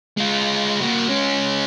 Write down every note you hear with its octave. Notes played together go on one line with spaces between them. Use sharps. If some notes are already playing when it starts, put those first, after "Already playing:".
G#3 F4
A#3 F#4
G#3 C#4